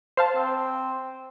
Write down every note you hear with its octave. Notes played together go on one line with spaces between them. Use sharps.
C5 F5 A5
C4